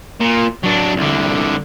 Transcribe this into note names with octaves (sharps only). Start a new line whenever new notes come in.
A#2
F#3 D4
C2 D3